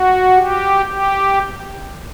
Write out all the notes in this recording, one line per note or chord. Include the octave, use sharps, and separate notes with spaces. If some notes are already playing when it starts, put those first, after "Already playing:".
Already playing: F#4
G4
G4